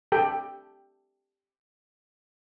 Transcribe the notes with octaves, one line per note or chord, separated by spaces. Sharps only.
G4 A4 G5